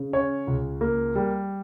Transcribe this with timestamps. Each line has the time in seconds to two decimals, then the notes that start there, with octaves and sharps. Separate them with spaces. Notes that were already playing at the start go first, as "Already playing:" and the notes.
Already playing: C#3
0.13 C#4 C#5
0.47 C#2
0.81 A#3
1.15 G3